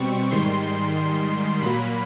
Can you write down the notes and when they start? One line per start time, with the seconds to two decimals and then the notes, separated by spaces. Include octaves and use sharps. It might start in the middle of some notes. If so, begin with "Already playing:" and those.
Already playing: B2 G3 C4 C#6
0.31 G#2 D#3 G3 C6
1.61 A#2 F#3 A#3 B5